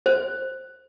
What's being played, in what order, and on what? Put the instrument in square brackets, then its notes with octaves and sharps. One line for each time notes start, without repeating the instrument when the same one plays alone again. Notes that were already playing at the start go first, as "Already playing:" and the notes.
[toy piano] C5